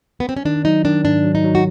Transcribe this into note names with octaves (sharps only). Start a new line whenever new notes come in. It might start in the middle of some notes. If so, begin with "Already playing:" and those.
B3
C4
C#4
D#3 D4
F#3 D#4
D#3 D4
G#2 D4
F#3
D#4
F#3
F#4